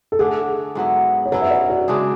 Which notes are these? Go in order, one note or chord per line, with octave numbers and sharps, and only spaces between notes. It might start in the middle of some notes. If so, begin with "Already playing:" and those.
A4
D3 A3 D4 G#4
G#2 F#3 B3 E4
C#5
F#3 C#4 E4 B4
E5
D5
F#4
C#3 G#3 D4 G#4